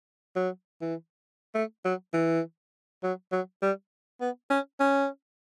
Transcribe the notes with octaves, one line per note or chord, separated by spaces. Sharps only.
F#3
E3
A3
F#3
E3
F#3
F#3
G3
B3
C#4
C#4